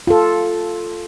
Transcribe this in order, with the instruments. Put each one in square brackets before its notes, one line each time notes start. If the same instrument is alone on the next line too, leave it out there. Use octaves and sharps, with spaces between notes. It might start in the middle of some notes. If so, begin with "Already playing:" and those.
[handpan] F4 A4